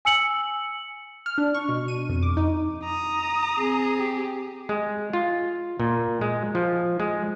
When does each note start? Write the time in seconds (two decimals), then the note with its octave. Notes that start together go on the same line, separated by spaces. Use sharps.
0.05 G#5 E6 C#7 F#7
1.26 F6
1.38 D4
1.55 C#6
1.69 B2
1.88 D#7
2.09 F2
2.23 D6
2.37 D#4
2.84 A#5 D#6
3.58 C4 G#4
3.99 G4
4.69 G#3
5.13 F4
5.80 A#2
6.21 G#3
6.55 F3
7.00 G#3